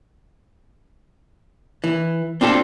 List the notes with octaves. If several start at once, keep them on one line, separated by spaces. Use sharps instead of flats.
E3
C4 D4 F4 G#4 A4